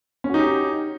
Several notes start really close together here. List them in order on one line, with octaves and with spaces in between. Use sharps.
C#4 F#4 D#4 G4